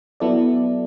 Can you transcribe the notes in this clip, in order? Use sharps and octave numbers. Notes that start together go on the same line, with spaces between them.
F#3 B3 E4 A4 D5